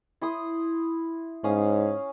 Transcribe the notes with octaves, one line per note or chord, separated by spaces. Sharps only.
E4 C6 D#6
G#2 C#4 F5 D#6